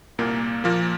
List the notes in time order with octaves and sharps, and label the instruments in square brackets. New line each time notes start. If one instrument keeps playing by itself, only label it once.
[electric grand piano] C2 A#2 A#3
A#2 F3 A#3